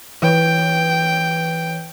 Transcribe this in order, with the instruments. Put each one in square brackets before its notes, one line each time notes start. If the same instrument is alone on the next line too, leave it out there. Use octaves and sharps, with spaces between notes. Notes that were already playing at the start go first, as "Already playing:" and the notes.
[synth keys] E3 B4 C#5 [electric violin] G5